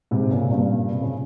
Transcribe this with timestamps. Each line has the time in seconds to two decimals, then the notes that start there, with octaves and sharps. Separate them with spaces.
0.11 G#2 C3
0.31 A#2 C#3
0.51 G2 A#2
0.92 C3
1.02 C#3